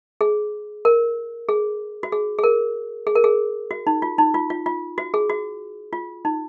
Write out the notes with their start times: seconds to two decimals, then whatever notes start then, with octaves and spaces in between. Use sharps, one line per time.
0.21 G#4
0.85 A#4
1.49 G#4
2.03 F#4
2.12 G#4
2.38 G#4
2.44 A#4
3.07 G#4
3.15 A#4
3.24 G#4
3.71 F#4
3.87 D#4
4.02 F4
4.18 D#4
4.34 F4
4.50 F4
4.66 F4
4.98 F#4
5.14 G#4
5.30 F#4
5.93 F4
6.25 D#4